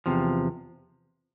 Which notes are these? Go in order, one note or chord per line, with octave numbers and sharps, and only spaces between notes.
E2 C3 F3